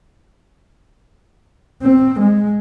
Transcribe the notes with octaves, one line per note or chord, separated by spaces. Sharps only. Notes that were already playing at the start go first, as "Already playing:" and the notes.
C4
G#3